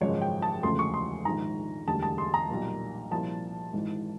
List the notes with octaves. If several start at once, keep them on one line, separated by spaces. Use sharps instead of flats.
G#1 F#2 C#3 F3 G#3 C#5
G5
A5
E1 D2 C#3 F3 A3 C6
C#6
C6
A#1 G#2 D#3 A#5
E1 D2 D3 G3 A5
A5
C6
A#5
B1 A#2 G3 A#3
C2 A#2 F3 A5
G#1 G#2 E3